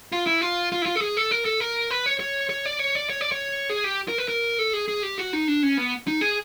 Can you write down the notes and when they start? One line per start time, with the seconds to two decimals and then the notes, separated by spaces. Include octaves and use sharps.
0.12 F4
0.26 E4
0.41 F4
0.72 F4
0.82 E4
0.86 F4
0.95 A4
1.01 G#4
1.17 A4
1.31 A#4
1.45 A4
1.60 A#4
1.91 B4
2.06 C#5
2.20 C#5
2.49 C#5
2.65 D5
2.79 C#5
2.95 D5
3.09 C#5
3.21 D5
3.32 C#5
3.70 G#4
3.84 G4
4.08 A#4
4.18 B4
4.28 A#4
4.59 A4
4.73 G#4
4.88 G#4
5.03 G4
5.18 F#4
5.33 D#4
5.48 D4
5.63 C#4
5.77 B3
6.07 D#4
6.21 G#4